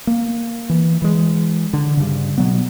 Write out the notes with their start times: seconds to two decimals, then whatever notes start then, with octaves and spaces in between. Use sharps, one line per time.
0.07 A#3
0.70 E3
1.02 E3 G#3
1.73 D3
1.97 G2 C#3
2.38 B2 F#3 B3